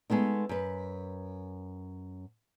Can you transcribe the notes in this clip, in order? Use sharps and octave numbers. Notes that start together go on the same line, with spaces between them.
G#3 A3 B3 D#4
F#2 B4